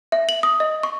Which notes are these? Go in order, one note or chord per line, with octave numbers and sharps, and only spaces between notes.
E5
F#7
D#6
D#5
C#6